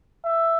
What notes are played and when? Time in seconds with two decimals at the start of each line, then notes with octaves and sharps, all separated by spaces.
0.25 E5